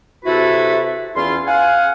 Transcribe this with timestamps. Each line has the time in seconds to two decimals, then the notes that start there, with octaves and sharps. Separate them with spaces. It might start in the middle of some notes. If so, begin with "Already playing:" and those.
0.25 C3 E4 F#4 A4 B4 E5
1.16 E2 C#4 E4 F4 C6
1.47 F5 F#5 G#5